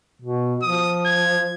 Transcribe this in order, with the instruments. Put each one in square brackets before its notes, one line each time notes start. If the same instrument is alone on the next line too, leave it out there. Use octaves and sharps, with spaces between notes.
[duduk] B2
[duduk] F3 [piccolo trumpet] D#6
[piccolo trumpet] G#6